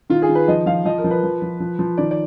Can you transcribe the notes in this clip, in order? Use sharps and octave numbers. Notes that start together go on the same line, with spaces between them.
D#3 F4
G#4
D#3
B4
F3 D#5
F3 F5
F3 D#5
A#4
F3
B4
F3
F3
F3
F3
D#3 D5
D5